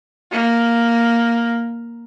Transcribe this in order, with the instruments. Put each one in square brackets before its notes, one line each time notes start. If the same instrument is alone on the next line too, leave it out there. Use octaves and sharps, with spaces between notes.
[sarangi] A#3